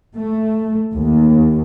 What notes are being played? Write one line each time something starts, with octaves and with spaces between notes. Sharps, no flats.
A3
D#2